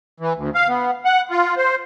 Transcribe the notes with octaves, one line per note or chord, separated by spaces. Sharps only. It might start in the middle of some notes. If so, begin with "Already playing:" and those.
E3
D2
F5
B3
F#5
F4
C5